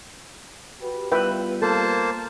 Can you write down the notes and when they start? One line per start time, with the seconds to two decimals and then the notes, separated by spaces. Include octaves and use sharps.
0.80 F#4 G4 B4
1.12 G3 B3 F4 B4 E5 G5
1.62 A#3 A4 C5 A5